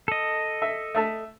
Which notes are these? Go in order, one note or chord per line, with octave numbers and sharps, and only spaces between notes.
A4 D#5
E5
A3 E5 A5